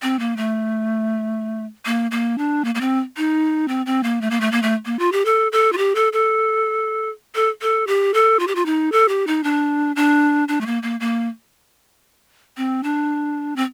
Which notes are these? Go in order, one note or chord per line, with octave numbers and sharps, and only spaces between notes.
C4
A#3
A3
A#3
A#3
D4
A#3
A#3
C4
D#4
C4
C4
A#3
A3
A#3
A3
A#3
A3
A#3
F4
G4
A4
A4
F4
G4
A4
A4
A4
A4
G4
A4
F4
G4
F4
D#4
A4
G4
D#4
D4
D4
D4
A3
A#3
A#3
A#3
C4
D4
C4